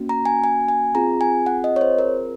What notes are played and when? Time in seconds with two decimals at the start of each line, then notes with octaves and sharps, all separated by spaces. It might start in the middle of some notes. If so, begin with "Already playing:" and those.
Already playing: A#3 C#4 F#4
0.09 A#5
0.26 G#5
0.44 G#5
0.68 G#5
0.95 C4 F4 G#4 A#5
1.21 G#5
1.46 F#5
1.64 D#5
1.76 C#5
1.81 C5
1.98 A#4